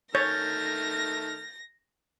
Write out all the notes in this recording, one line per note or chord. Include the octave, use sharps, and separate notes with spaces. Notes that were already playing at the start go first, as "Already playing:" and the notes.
D#3 A3 C#5 F6 G6 A6 A#6